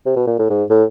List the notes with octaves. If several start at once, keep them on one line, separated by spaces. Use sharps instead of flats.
C3
B2
A#2
A2
G#2
A2